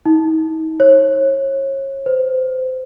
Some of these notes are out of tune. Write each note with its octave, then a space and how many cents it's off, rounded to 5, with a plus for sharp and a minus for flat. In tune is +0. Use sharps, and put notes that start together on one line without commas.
D#4 +40
C#5 -30
C5 -25